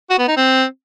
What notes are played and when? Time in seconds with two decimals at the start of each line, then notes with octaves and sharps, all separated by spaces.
0.10 F#4
0.19 B3
0.28 D#4
0.37 C4